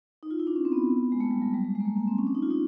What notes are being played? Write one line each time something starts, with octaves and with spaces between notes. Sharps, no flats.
D#4
F4
E4
D4
C#4
C4
B3
G#3
A3
G3
F#3
G3
G#3
G#3
A#3
A3
A#3
C4
C#4
D4
D#4
F4
D#4